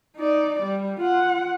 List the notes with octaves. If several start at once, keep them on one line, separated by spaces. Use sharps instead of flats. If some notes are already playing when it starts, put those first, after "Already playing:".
D#4 D5
G3
F4 F#5